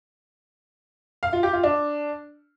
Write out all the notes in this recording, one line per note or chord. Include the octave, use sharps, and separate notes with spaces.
F5
F4
G4
F4
D4